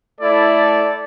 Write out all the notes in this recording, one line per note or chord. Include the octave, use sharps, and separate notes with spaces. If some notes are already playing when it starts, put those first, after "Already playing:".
A3 E4 A4 D5